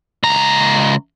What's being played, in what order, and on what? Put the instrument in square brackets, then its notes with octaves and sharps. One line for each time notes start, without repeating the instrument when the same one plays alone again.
[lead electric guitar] C#2 A#5